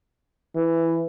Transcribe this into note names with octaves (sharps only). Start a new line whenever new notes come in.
E3